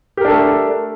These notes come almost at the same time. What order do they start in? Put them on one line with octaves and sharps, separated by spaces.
G4 A#4 D4 A4 A3